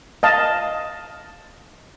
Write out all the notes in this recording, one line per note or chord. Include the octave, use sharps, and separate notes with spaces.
D#5 F5 A5